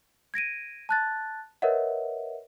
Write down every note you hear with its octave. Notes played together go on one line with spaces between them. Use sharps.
G#6 A#6 D7 D#7
A5 F#6 A6
A#4 B4 C#5 D#5 E5 F#5